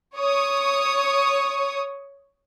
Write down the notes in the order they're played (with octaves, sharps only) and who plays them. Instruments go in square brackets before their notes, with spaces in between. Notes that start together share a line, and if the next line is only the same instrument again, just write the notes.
[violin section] C#5 C#6 D#6